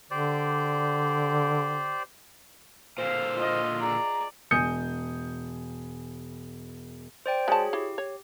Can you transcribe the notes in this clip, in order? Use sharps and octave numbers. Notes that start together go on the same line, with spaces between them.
D3 G4 C5 D5
A#2 D3 C5 F5
F4 D#5
G#4 D5 A#5
E1 G#5 D#6 G6 C#7
C5 D5 G5
G#3 F#4 G#4 C#5 A5
E4 G4
C#5